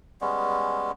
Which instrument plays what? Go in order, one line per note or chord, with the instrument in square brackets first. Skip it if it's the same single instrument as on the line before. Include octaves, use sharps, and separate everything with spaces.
[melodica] G3 G#3 B3 C#4